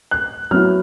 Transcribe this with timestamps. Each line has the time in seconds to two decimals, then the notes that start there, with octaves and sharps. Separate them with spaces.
0.11 F#6
0.51 F#3 B3 E4 F6